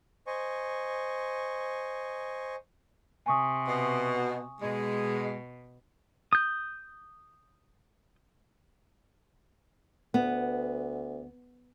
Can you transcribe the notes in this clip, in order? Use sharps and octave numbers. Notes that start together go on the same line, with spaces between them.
C5 D#5 G#5 C#6
C3 G#5 C#6 D#6
B2
B2 G#3
D#6 G6
D2 B3